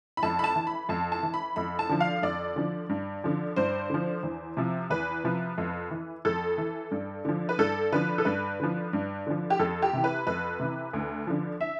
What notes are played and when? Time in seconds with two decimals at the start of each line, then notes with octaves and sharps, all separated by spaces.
0.17 B5
0.23 F2 A5
0.39 B5
0.44 A5
0.55 E3
0.67 B5
0.89 F2 A5
1.12 A5
1.23 E3
1.34 B5
1.56 F2 B5
1.79 A5
1.89 D3 F3
2.00 F5
2.23 F2 D5
2.56 D3 F3
2.89 G2
3.24 D3 F3
3.56 G2 C5
3.90 D3 F3
4.23 E2
4.57 C3 F3
4.90 E2 B4
5.24 C3 F3
5.58 F2
5.91 E3
6.25 F2 A4
6.58 E3
6.91 G2
7.25 D3 F3
7.49 B4
7.58 G2 A4
7.92 D3 F3 B4
8.18 A4
8.25 G2 B4
8.60 D3 F3
8.93 G2
9.27 D3 F3
9.50 G4
9.59 F2 A4
9.82 G4
9.93 C3 E3
10.04 B4
10.27 F2 B4
10.59 C3 E3
10.93 D2
11.27 D3 F3
11.61 E5